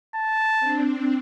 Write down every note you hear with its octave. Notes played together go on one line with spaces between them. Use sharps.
A5
C4 D4